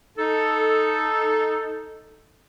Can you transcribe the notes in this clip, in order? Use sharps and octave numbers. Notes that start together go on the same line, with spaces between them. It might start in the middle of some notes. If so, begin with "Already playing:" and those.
D#4 A4